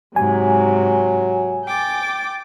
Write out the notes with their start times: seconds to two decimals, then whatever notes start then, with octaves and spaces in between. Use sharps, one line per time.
0.16 G#2 C3 F#3 G#5
1.65 G5 D6 A6